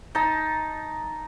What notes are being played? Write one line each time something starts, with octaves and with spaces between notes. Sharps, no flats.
D#4 A5